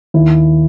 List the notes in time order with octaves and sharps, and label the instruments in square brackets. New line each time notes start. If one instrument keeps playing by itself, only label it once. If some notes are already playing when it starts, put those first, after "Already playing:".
[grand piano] D#2 E4